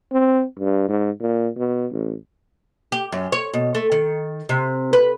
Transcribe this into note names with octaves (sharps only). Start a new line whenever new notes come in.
C4
G2
G#2
A#2
B2
A1
G4
F#2
C#5
B2
A3
D#3
C3
B4